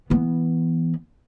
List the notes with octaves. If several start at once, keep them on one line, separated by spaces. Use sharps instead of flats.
E3 B3